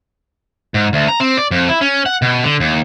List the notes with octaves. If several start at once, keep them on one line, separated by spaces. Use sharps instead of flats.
G#2
D2
A#5
C4
D5
F2
E4
C#4
F#5
B2
D3
D#2